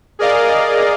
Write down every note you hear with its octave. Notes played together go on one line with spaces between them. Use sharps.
G#4 A#4 D5 D#5 F5